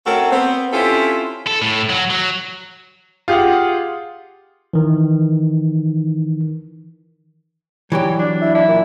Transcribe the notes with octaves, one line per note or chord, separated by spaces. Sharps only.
A3 C4 C#4 F#4 A4 A#4
B3 C4
C4 C#4 E4 F4 G4 A4
A4
A2
F#3
F#3
F4 G4 G#4 F5 F#5
D#3 E3
E3 F#3 G3 G4
D4
E4
D4 E4
A#2